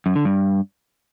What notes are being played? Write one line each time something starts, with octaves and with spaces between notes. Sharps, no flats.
F#2
D3
G2